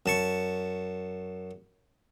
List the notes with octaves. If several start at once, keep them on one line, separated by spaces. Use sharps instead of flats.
F#2 A5 C#6